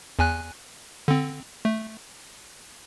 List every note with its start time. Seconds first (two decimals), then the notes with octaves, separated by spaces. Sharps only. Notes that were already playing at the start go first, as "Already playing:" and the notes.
0.19 E2 G#5 F#6
1.08 D3 C4
1.65 A3